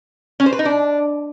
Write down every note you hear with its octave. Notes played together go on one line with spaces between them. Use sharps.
C#4
C5
B4
D#4
D4